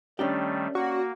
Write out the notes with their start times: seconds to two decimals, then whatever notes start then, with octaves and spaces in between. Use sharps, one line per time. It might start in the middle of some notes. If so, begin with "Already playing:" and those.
0.19 D#3 G3 A3 C#4 D4 G4
0.75 A#3 F#4